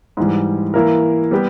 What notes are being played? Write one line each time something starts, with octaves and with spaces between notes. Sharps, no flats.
G#2 E3 G3
E3 A#3 E4 A#4
G3 B3 G4